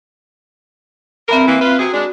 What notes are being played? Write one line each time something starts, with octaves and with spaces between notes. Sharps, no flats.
G2 C4 A#4 E5 B5
E3 A#3
F4 B4
C3 F#4 G#4
G#3 D4